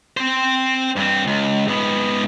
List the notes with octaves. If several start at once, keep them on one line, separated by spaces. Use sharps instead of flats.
C4 C5
G2 C4
C#2
G#2 B3